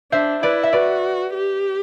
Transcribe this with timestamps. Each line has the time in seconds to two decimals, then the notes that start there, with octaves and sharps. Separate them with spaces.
0.12 D4 C5 E5
0.43 E4 B4 D5
0.63 E5
0.73 F#4 B4 D5
1.34 G4